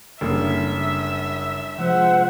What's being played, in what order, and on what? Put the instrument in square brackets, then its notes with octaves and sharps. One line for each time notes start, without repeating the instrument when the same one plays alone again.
[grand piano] F#1 [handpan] G3 D4 A4 [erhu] E5
[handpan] C3 F3 G#3 [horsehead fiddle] C5 F#5